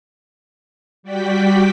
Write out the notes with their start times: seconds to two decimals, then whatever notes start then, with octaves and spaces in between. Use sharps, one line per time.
1.03 G3 F#4 D5 G5 B6